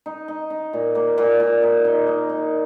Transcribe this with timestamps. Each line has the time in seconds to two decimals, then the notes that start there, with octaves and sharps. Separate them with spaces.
0.06 D#4
0.28 D#4
0.50 D#4
0.73 A#2
0.95 A#3
1.18 A#2
1.40 A#2
1.62 D#4
1.85 D#4
2.07 D#4
2.29 D#4